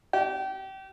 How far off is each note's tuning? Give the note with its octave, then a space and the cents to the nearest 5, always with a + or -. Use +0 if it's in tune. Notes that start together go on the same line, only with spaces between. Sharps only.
G4 -30